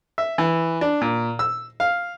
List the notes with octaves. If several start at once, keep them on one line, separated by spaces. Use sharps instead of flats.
E5
E3
D4
A#2
E6
F5